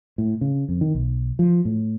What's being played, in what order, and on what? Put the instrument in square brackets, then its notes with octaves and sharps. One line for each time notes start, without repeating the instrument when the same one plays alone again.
[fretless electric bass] A2
C#3
F2
D#3
B1
F3
A2